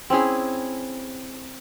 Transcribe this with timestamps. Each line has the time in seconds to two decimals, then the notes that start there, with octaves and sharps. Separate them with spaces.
0.10 C4 C#4 E4 G#4